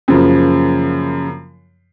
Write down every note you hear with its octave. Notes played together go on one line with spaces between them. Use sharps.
F#2 C#3 F3 A#3